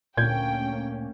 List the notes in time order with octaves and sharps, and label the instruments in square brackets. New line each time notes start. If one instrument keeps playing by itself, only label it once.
[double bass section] D2 A#3 C#4 [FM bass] A#2 [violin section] G5 [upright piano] G6 G#6